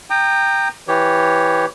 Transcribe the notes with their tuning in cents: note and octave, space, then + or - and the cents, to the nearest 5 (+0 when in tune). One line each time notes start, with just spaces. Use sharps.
G5 +5 A#5 -15 D#6 -45
E3 +0 G4 +0 C#5 +0